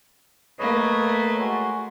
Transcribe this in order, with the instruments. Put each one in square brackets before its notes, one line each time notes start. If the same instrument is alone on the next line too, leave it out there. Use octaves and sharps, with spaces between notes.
[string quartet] A3 A#3 [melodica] B4 C#5 D#5
[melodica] G#3 F#4 C6